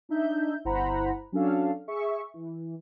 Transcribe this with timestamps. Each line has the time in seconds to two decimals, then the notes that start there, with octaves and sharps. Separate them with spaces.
0.09 D4 D#4 E5 G6
0.65 G1 E4 C5 F#5 A#5 B5
1.32 F#3 C#4 D4 A4 F5
1.88 G#4 E5 C#6
2.34 E3